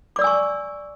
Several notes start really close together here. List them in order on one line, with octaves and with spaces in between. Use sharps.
D6 D5 E6 G#5 C#6